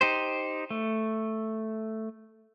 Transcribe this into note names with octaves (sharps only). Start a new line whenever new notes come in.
D#4 G4 C5
A3